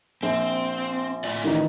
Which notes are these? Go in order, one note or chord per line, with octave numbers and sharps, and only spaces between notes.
A#1 C4
A2 F4 D5
D#3 E3 D#4